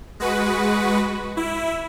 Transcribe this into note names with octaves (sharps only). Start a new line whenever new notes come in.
G#3 F#4 B4
E4